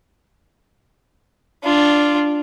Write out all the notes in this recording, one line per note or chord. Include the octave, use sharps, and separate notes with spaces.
D4 F4